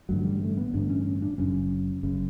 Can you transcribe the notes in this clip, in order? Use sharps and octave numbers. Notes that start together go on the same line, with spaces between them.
A1 G2 D3 F#3
G3
A3
B3
A1 G2 D3 D4
C#4
C#4
D4
F#1 F#2 C#3 C#4
F#1 F#2 C#3